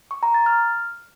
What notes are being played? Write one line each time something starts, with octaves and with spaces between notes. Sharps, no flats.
C#6
A#5
A6
F6